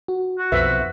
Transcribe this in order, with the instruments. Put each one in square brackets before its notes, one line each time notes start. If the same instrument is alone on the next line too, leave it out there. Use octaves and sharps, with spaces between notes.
[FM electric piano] F#4
[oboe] F#4
[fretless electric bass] B1 F2 [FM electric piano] B4 C5 F#6 [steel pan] E5